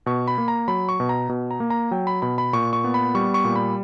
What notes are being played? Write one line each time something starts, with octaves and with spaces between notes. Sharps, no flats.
B2 C#6
B5
A#3
A#5
F#3 B5
C#6
B2
A#5
B2
A#5
A#3
A#5
F#3 G5
B5
B2 B5
B5
A#2 C#6
C#6
B3
B5
G3 C#6
C#6
A#2
B5